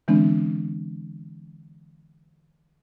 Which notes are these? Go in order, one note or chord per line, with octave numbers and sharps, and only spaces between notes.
D3 E3 G#3 B3 C4 D4